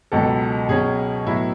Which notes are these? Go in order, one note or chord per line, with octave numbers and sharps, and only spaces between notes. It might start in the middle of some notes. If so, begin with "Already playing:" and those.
C#2 B2 F#3 A4
B2 F#3 C#4 G#4
A2 F#3 B3 E4